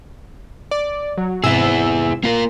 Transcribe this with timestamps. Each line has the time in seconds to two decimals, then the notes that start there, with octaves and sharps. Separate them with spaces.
0.71 D5
1.18 F#3
1.44 G#2 C3 E4 G#4 E6
2.23 A#3 F4 A#4